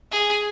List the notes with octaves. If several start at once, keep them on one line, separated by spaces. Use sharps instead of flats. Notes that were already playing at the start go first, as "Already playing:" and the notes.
G#4